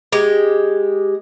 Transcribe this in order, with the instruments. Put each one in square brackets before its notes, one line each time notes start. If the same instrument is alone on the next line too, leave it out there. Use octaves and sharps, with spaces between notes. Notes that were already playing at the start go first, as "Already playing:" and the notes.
[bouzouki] G#3 G4